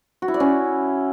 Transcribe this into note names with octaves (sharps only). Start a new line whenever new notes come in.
F#4
E4
D5
C#4